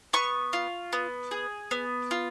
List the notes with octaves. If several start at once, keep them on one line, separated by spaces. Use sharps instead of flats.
B3 C#6
F4
B3
G#4
B3
F4